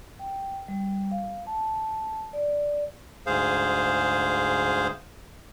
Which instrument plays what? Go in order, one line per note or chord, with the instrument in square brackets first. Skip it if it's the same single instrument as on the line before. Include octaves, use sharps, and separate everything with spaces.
[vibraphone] G5
G3
F5
A5
D5
[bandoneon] D2 G#2 G#4 C5 F5